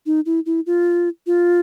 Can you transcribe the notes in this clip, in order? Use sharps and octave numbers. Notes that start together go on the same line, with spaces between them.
D#4
E4
E4
F4
F4